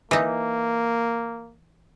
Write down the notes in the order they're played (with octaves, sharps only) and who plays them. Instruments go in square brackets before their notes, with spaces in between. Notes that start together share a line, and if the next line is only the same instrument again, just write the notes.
[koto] E3 D#4 [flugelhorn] A#3